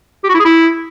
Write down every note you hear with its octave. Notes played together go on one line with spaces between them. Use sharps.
G4
F#4
E4
G#4
E4